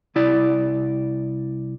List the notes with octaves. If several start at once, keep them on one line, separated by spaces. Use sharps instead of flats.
C2 E4 D5